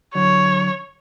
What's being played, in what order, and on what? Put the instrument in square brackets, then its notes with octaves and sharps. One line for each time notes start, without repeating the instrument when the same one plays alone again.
[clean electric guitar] D3 F#3 [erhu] C#5